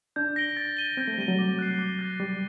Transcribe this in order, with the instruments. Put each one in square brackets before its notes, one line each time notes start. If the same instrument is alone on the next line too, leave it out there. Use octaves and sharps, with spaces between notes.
[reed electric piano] D4 [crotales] G6
[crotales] A#6 D7 G7
A6
D#7 G7
[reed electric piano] C4 [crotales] G6
[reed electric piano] A3
[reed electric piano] G3 [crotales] A#6 D#7
[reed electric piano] F#3
[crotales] D6
F#6 C7
D6
F#6 A6
[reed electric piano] G3 [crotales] D6